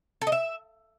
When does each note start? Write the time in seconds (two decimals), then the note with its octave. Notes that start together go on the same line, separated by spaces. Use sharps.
0.21 A4
0.27 D#5
0.32 E5